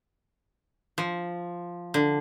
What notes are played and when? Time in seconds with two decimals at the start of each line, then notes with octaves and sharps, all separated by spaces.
0.98 F3
1.94 D3